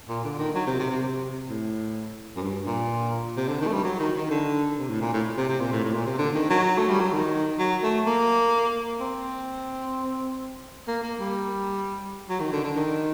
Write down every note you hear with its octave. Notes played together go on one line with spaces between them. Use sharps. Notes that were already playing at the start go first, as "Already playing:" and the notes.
A#2
D3
D#3
F#3
C3
C3
C3
C3
A2
F#2
G2
A#2
C3
D3
D#3
A3
G3
F#3
D#3
D#3
D3
C3
A2
A#2
A2
C3
C3
A#2
A2
A2
A#2
C3
D3
D#3
F#3
A3
G3
F#3
D#3
F#3
A3
A#3
C4
A#3
A#3
G3
F#3
D#3
D3
D3
D#3